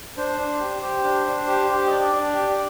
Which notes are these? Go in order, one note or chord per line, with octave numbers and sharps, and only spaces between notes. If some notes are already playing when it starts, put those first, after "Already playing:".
D4 C5
D4
G4
G4
D4
D4
G4
G4
D#5
D4 D5
D4
G4